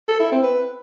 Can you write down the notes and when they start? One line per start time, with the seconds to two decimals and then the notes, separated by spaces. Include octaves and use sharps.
0.08 A4
0.20 E4
0.31 C4
0.43 B4